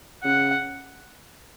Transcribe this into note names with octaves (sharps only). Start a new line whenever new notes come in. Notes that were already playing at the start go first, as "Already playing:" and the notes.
C#3 F#5